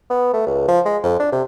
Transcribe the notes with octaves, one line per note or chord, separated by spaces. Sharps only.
B3
A3
C#2
F3
G#3
F2
D4
C3